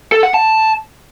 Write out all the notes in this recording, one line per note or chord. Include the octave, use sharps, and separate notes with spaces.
A4
F#5
A5